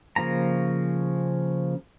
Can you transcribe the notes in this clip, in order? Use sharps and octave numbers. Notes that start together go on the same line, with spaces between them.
C#3 F3 A#3 A#5